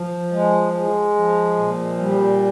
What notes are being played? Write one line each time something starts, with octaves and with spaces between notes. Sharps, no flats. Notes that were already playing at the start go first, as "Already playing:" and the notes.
Already playing: F3
G#3
G#3
F3
A#2
G3